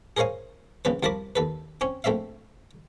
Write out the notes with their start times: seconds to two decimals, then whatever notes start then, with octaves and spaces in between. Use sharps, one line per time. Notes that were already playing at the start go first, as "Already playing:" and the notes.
0.17 G#4 A#4 C5 C#5 F5 G#5
0.85 A#1 C#3 B3 B4
1.03 C2 F3 A#4 A5 B5 D6
1.36 D#2 A4 B4
1.81 C4 C#4 C#5
2.04 A#1 A3 C4 E5 F5